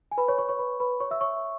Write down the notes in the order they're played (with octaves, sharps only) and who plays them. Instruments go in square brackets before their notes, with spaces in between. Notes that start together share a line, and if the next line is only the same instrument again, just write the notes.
[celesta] G#5
B4 B5
C#5 C#6
C#5 C#6
C#5 C#6
B4 B5
B4 B5
C#5 C#6
E5 E6
C#5 C#6